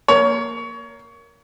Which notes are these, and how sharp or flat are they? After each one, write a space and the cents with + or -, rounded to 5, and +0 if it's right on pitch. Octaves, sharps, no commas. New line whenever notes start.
A#3 +0 C#5 +25